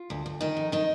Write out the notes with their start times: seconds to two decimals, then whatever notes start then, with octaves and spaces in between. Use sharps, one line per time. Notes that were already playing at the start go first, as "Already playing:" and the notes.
Already playing: F4
0.10 D2
0.26 D2
0.41 D#3 D#4
0.57 F2
0.72 D#3 D#4